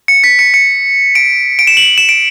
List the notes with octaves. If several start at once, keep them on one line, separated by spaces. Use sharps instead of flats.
C#7
B6
C#7
C#7
D7
D7
E7
F#7
E7
D7